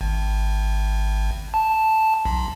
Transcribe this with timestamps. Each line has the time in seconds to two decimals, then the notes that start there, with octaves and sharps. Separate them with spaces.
0.01 G#1
1.54 A5
2.26 B1